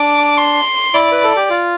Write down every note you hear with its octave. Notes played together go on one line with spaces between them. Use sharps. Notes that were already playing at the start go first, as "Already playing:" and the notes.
Already playing: D4 D6
C6
E4 D5
B4
A4
G4
F4